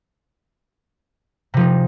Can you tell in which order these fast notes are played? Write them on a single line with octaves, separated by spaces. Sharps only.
C3 F3 D#4